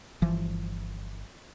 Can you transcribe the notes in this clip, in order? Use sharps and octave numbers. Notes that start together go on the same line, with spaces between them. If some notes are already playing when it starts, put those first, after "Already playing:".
G1 E3 F3